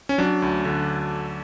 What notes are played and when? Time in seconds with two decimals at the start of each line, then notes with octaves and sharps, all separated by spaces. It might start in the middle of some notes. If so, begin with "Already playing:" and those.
0.09 C#4
0.18 F#3 D4
0.42 D2
0.65 D3